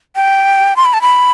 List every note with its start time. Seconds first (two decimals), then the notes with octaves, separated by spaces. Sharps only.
0.16 G5
0.76 C6
0.85 B5
0.94 A5
1.02 B5